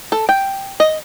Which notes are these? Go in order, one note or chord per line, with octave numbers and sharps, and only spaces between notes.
A4
G5
D#5